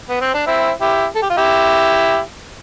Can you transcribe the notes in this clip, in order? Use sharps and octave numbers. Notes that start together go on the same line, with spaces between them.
B3
C4
D4
C4 E4
E4 G4
A4
G4
F4
E4 G4